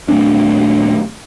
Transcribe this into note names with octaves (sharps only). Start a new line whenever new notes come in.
D#1 A3 C4 D4